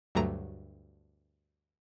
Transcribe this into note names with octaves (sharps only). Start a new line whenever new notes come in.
D2 G2 F#3 A3 A#5